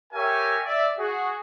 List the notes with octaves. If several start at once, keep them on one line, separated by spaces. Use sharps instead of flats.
G4 A#4 C#5 E5 G#5
D5 E5
F#4 G#4